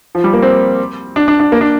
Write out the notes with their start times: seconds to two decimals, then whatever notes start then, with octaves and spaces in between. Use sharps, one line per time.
0.15 F3
0.24 G3
0.33 A#3
0.42 C4
1.16 D4
1.28 D4
1.40 D4
1.52 A#3
1.61 D4